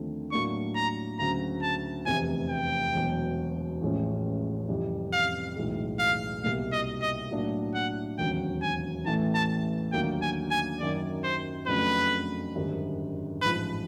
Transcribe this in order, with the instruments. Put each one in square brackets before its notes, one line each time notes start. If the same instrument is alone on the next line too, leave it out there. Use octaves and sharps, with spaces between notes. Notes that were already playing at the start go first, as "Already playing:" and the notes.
Already playing: [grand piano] D#2 D3 F3 A3 C4
[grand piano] A2 F#3 A#3 D4 [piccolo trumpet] C#6
[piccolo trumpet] A#5
[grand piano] D2 C#3 F#3 [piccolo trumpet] A#5
[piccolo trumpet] A5
[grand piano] F1 E2 C3 [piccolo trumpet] G#5
[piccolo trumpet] G5
[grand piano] E1 E2 B2 F#3
A1 A2 F3 G#3 C#4
F2 C3 E3 G3
[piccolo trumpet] F5
[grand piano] B1 A2 E3 G#3
[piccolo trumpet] F5
[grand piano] C2 B2 G3 A#3 [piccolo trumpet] F5
[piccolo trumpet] D#5
D#5
[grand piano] A2 F#3 A#3 D4
[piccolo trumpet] F#5
[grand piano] E1 D#2 C#3 F#3 [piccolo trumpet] G5
[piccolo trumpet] G#5
[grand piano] A1 A2 E3 A3 [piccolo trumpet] A5
[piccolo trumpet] A5
[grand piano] D#2 D3 F#3 A#3 D#4 [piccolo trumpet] G5
[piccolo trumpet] G#5
G#5
[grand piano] F#2 D#3 F#3 [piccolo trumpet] D5
[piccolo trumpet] C5
[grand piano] F2 C#3 F#3 A3 D4 [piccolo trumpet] B4
[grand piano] G#1 F#2 D3 G3
[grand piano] A1 G#2 F3 [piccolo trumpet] B4